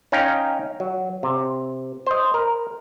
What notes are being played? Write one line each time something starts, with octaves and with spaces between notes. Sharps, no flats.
C#4 D#4 F5 G5
F#3
C3
C5 D#5
A#4